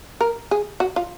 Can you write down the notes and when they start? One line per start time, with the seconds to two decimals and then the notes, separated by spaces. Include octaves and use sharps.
0.21 A#4
0.51 G#4
0.80 F#4
0.96 F4